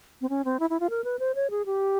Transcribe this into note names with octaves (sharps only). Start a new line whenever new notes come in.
C4
C#4
C4
E4
E4
F4
A#4
B4
C5
C#5
G#4
G4